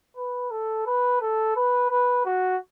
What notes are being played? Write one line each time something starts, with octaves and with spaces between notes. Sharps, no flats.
B4
A4
B4
A4
B4
B4
F#4